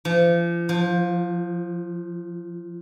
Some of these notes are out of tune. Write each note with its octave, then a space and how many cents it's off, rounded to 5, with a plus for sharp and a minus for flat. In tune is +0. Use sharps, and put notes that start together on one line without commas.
F3 -35
F3 +15